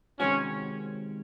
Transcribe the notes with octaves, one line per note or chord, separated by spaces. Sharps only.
C3 D#3 G#3 C4 C#4 F#4